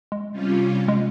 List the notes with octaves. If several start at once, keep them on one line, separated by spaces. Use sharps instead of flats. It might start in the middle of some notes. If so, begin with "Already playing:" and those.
G#3
C3 G3 C#4 F4
G#3